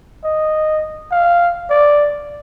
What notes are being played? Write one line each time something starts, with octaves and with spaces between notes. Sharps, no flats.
D#5
F5
D5